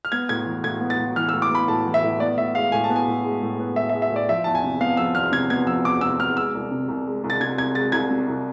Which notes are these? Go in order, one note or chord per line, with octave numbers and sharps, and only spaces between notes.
F6
B3 G#6
A2 G#6
E3
A2 G#6
B3
A6
A2
E3 F6
E6
A2
D6
B3 B5
A2 A5
E3
E5
A2
B3 D5
A2 E5
G#3 F5
A2 G#5
A5
B3
G#5
A2
G#3
A2
B3
A2 E5
E5
G#3
E5
A2
D5
F3 E5
E2 A5
G#5
C3
B3 F5
F3 E6
E2 F6
C3 G#6
B3 G#6
F3 E6
E2 D6
C3 E6
B3 F6
G#3 E6
C2
C3
C2
G#3
C2
A6
C3 G#6
C2 G#6
G#3 A6
C2 G#6
C3
C2